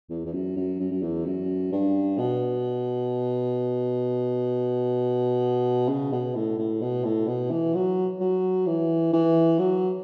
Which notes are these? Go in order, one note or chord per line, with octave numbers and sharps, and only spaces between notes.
E2
E2
F#2
F#2
F#2
F#2
E2
F#2
G2
B2
C#3
B2
A2
A2
B2
A2
B2
E3
F#3
F#3
E3
E3
F#3